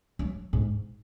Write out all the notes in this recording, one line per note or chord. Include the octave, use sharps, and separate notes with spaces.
F#3
G#2